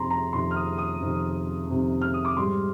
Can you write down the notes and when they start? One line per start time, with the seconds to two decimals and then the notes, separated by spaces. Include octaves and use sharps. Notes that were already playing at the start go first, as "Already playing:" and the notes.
Already playing: F2 C3 D#3 A#5 C6
0.10 A#5
0.33 F2 C3 D#3 C6
0.51 F6
0.56 D#6
0.78 D#6
1.01 F2 C3 D#3
1.68 F2 C3 D#3
2.02 F6
2.14 D#6
2.25 D6
2.37 G#2 G3 C6